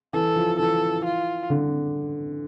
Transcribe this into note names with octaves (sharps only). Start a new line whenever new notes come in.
E3 A4
F3
E3 A4
F4
D3